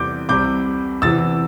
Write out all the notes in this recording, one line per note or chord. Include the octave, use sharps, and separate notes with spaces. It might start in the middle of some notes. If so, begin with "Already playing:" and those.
Already playing: E2 C3 E3 G3 D6 G6
C2 C3 G3 D6 G6
E2 C3 E3 E6 A6